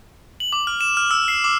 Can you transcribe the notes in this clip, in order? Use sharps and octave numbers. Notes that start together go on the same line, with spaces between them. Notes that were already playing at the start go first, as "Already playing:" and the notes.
F#7
D6
F6
E7
F6
E6
C7
D6